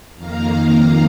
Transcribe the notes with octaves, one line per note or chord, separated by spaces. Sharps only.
F2 D#3 A#3 F5 A#5